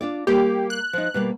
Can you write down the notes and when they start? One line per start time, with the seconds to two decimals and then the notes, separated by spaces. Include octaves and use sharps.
0.01 D4 F4 D5
0.27 G3 A#3 G4
0.70 F#6
0.93 F3 D#4
1.14 B2 G3 A#3